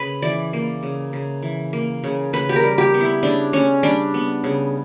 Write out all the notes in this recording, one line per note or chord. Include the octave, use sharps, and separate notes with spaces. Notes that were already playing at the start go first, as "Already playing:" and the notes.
Already playing: C#3 B4
E3 D5
A#3
C#3
C#3
E3
A#3
C#3
C#3 B4
G4
A#4
G3
G4
B3
E4
C#3 D4
C#3 C#4
G3 D4
B3
C#3